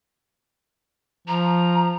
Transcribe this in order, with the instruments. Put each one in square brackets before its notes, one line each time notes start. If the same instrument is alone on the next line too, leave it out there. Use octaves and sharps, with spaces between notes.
[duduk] F3 [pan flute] A#5